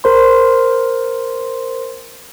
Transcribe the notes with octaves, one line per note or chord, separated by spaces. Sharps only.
A#4 C5 C6